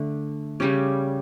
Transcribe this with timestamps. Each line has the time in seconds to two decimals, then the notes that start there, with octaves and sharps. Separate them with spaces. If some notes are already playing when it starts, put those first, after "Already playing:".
Already playing: D3 A3 D4
0.60 C#3 G3 C#4 G4